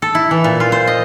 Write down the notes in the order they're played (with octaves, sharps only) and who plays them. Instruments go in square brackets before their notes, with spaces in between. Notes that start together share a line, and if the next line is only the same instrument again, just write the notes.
[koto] A4
E4
E3
A#2
F4
C5
D#5